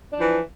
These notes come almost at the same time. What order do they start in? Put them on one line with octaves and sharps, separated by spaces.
D4 F3 E3